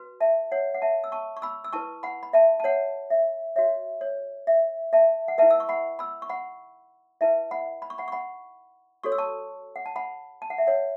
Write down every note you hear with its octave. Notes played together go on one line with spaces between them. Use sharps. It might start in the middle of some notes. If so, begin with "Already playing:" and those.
Already playing: F#4 B4
E5 A5
C#5 F#5
F#5
E5 A5
E6
A5 C#6
C#6
B5 E6
E6
E4 B4 A5 C#6
F#5 B5
B5
E5 A5
A5
C#5 F#5
E5
F#4 C#5 E5
C#5
E5
E5 A5
F#5
E4 B4 E5 A5
E6
C#6
F#5 B5
B5 E6
C#6
F#5 B5
E4 B4 E5 A5
F#5 B5
B5
C#6
F#5 B5
C#6
F#5 B5
F#4 A4 C#5 C#6
E6
A5 C#6
F#5
A5
F#5 B5
A5
F#5
E5
C#5 F#5